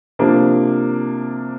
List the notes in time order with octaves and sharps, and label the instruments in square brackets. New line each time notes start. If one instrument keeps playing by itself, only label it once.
[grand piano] C3 F3 A#3 D4